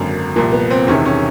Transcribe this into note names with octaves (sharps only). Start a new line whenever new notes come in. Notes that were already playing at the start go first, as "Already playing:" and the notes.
Already playing: G#1 F#2 D3 A#3
C2 A#2 F3 A#3
B3
C4
E1 E2 C3 D#3 C#4
C#4